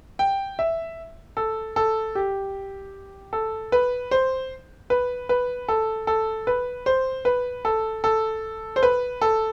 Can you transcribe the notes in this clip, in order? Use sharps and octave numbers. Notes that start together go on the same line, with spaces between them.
G5
E5
A4
A4
G4
A4
B4
C5
B4
B4
A4
A4
B4
C5
B4
A4
A4
C5
B4
A4